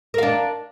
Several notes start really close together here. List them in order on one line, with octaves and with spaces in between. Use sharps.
A#4 F5 D4